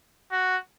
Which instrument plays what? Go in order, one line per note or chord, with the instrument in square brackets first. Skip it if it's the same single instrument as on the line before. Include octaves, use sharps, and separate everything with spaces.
[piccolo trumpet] F#4